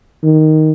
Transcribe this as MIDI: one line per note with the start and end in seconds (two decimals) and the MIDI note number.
0.23 0.73 51